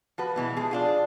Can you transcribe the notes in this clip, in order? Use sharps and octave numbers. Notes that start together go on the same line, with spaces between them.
F3 F#4 B4
B2 E3 G#3
F3 G#4
D4 F4 G#4